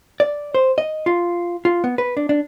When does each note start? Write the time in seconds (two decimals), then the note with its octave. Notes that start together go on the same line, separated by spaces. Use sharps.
0.20 D5
0.55 C5
0.78 D#5
1.06 F4
1.65 F4
1.84 B3
1.98 B4
2.17 D4
2.29 D4